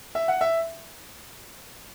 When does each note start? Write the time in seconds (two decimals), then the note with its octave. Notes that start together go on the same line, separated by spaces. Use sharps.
0.15 E5
0.28 F#5
0.41 E5